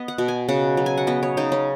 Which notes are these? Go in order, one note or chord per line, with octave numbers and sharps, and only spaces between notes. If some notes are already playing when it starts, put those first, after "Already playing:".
Already playing: B3 D#5
F#5
B2
G#5
C#3 F#5
F#3
G#5
F#5
B3 D#5
C#5
C#3 D#4
C#4